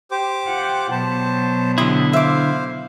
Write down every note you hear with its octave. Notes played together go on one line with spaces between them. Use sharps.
G4 C5 D6
F4 F#5 G5
B2 F#3 C5 A5
D3 E4 G4 C5 D#6
C5 E5 F5 D6